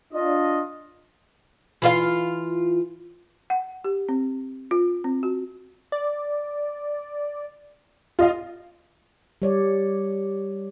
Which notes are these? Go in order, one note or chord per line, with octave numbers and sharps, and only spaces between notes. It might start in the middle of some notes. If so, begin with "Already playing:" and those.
D4 F4 D#5
E3 F4 F5
F#5
G4
C4
F4
C4
F#4
D5
F4 D#5 F5
G3 C#5 D5